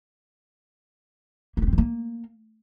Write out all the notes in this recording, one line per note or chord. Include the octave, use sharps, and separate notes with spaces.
A#3
B3
C4
E3
A#3